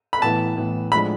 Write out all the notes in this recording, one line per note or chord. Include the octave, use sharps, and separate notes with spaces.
B5
A2 E3 B3 A5
A2 E3 B3
A2 F3 G#3 D4 B5